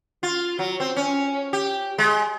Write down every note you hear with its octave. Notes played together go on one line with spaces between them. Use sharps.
F4
F#3
C4
C#4
G4
G#3